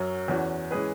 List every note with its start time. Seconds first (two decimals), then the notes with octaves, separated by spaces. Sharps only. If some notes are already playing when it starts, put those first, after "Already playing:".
Already playing: F#2 F#3 C#4
0.28 E2 E3 C#4 F#4
0.71 E3 G#3 C#4 G#4 B4